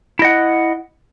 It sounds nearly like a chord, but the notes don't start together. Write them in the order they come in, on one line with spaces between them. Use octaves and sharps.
E4 D#5 F#5